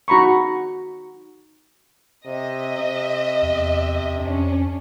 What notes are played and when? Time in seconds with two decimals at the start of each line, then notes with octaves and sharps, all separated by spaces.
0.08 D#4 F#4 A#5 B5 C#6
2.26 C3 D#5 E5
2.78 C3
3.42 E2
4.20 F2 C#4 D4